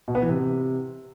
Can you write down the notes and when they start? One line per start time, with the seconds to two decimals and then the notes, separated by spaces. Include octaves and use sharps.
0.08 B2
0.15 B3
0.22 E3
0.29 C3